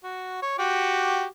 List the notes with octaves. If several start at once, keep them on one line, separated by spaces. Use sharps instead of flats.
F#4
C#5
F#4 G4 D6